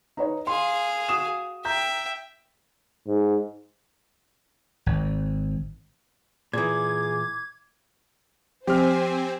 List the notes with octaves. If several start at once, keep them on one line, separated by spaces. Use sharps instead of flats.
D#4 B4 C#5
G#4 F5 C6
F#4 D#6 E7
E5 G5 A#5 G6
G#2
G#1
A#2 E3 G#4 D6 G#6
F3 C4 G4 C5 G#5 F6